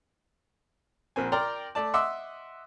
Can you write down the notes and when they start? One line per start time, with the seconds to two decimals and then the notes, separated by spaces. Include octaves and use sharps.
1.16 A#1 A#3 C4 G#5
1.32 A#4 D5 G5 A#5 C6
1.75 A3 D5 A5
1.94 D#5 E5 F#5 C6 D6 E6